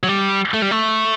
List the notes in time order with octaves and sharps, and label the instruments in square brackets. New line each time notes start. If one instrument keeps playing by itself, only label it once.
[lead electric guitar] F#3
G3
A3
G3
A3